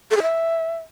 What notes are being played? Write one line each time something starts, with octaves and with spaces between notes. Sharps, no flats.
A4
G#4
E5